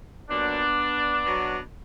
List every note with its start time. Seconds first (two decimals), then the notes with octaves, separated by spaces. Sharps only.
0.29 A#2 F#3 B3 D4
1.24 B2 F#3